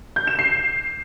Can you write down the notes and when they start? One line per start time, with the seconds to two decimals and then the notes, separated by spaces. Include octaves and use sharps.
0.16 G6
0.27 E7
0.39 C7